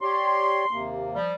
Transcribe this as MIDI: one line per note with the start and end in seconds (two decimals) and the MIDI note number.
0.01 0.65 67
0.01 0.65 73
0.01 0.65 74
0.01 0.90 84
0.71 1.17 39
0.71 1.17 48
0.71 1.17 58
1.14 1.33 53
1.14 1.33 55